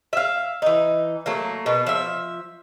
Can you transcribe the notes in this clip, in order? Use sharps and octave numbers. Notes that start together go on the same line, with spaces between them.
E5 F5
E3 D#4
F#3 A3 A#3
B2
F3 E5